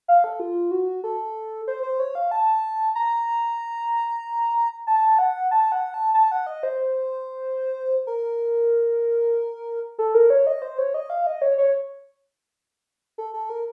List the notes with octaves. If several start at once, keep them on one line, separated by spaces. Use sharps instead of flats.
F5
A4
F4
F#4
A4
C5
C5
C#5
F5
A5
A#5
A5
F#5
A5
F#5
A5
A5
F#5
D#5
C5
A#4
A4
A#4
C#5
D#5
C5
C#5
D#5
F5
D#5
C#5
C#5
A4
A4
A#4